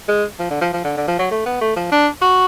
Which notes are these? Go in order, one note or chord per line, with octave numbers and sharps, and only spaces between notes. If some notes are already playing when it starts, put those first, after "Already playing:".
G#3
F3
D3
F3
F3
D3
D3
F3
F#3
A3
B3
A3
F3
D4
F#4